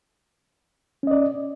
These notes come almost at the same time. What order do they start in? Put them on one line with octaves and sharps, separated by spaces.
C#4 D#5 D5